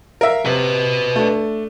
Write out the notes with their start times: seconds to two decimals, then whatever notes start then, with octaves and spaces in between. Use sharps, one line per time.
0.21 A#4 E5 F5
0.45 C3 B4 D#5
1.16 A3 D4